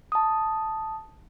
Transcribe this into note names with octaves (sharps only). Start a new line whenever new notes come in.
A5 D#6